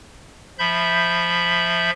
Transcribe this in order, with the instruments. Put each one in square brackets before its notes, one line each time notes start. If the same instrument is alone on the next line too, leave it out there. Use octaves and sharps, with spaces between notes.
[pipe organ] F3 E5 B5 G6